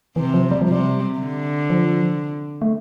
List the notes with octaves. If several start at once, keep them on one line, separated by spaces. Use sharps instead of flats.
C3 E3
F3
G3
F3
C3 G3
D3
F3
A3